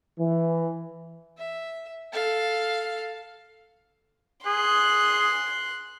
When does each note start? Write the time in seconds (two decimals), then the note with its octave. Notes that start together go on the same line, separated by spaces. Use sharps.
0.19 E3
1.38 E5
2.12 A4 F5
4.46 G#4 C6 F#6